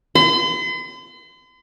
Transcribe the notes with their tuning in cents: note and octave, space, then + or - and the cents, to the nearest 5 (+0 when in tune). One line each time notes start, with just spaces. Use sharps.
C6 -45